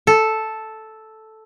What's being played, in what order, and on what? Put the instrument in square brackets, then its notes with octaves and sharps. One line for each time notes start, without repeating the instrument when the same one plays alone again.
[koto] A4